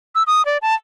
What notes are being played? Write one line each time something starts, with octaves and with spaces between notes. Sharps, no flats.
E6
D#6
D5
A5